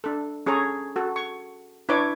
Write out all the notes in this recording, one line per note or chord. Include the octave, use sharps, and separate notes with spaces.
D4 A4
C#4 G#4 A4 C#5 A#5
F#4 A4
C#6
D4 E4 B4 C#5 D6